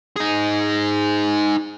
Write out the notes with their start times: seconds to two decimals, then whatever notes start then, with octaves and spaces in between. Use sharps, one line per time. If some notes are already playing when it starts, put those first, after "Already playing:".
0.16 D#4 G#4